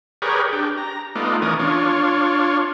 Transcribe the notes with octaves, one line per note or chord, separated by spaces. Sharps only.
G4 G#4 A#4 B4 C#5 D5
D4 G4
A#5
A3 B3 D#4 F4 D5
E3 C#4 A#4 D5 D#6
D4 F4 C#5